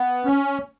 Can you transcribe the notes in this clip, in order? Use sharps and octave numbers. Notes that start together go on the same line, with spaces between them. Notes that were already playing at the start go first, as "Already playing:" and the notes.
Already playing: B3
C#4